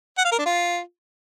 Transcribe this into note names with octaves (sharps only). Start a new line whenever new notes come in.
F#5
F5
A#4
D4
F4